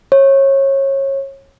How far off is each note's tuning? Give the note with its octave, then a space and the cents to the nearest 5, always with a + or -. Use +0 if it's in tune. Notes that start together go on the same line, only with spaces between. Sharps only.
C#5 -25